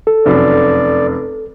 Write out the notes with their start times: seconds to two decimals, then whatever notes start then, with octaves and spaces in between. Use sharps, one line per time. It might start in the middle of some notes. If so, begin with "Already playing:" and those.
0.07 A4
0.26 F1 F#2 D5